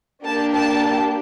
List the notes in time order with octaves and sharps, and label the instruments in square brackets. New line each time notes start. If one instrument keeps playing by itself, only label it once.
[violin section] A#3 D4 G4 A5
A5